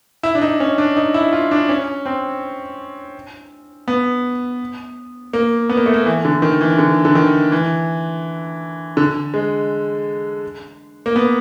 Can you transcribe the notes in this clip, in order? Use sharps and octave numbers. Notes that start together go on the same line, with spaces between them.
E4
D4
D#4
C#4
D4
D#4
E4
F4
D4
C#4
C4
B3
A#3
B3
A#3
A3
A#3
E3
D3
D#3
E3
D3
D3
D#3
E3
D3
G#3
A#3
B3